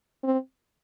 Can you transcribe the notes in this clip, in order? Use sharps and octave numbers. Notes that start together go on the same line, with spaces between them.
C4